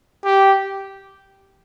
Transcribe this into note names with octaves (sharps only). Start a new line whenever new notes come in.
G4